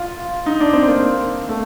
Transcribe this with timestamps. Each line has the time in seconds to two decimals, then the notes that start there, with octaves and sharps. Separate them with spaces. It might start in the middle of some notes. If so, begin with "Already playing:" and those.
Already playing: F4
0.46 D#4
0.60 D4
0.73 C4
0.88 A#3
1.49 A3